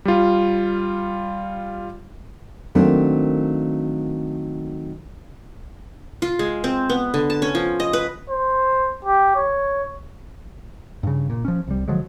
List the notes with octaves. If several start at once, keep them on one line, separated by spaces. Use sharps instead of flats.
G3 F4
D#3 F#3 A3 A#3 C4 D4
F4
G#3
C4
B3
D3
A5
C#4
F3
D#5
B4
C5
G4
C#5
G2 C#3
A#2
F3 C#4
C2 G3
D3 F3 F#3 G#3